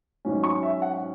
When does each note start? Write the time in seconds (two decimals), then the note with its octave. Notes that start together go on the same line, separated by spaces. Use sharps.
0.25 G#1 G#2 F#3 C#4
0.44 C#6
0.63 E5
0.82 F#5